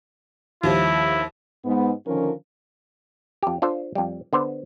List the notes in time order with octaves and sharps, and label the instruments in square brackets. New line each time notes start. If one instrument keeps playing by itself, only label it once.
[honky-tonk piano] D#2 F3 G3 [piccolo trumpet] E4
[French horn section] G#2 B3
D3 D#3 F3 C#4 F4 A#4
[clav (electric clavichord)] F2 G4
D4 F4 A4 C5
F2 G3
D3 B3 C5